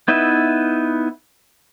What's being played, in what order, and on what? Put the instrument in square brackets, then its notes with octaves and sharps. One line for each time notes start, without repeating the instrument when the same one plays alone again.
[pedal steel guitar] B3 D#4 E4 B4 E5